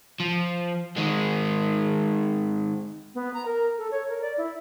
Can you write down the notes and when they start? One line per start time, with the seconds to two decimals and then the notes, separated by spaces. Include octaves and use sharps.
0.20 F3
0.96 D#3 G#3
3.15 B3
3.34 A#5
3.46 A#4
3.78 A4
3.91 C#5
4.09 A#4
4.21 D5
4.38 E4